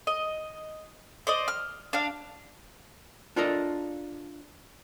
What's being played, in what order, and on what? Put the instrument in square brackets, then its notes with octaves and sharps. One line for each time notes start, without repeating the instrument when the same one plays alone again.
[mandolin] D#5
C5 D5 D#5
F6
D4 F5
[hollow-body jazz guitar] D4 F4 A4 A#4 D#5